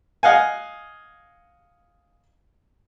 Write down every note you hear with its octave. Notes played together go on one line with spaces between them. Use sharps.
D#5 F5 F#5 G#5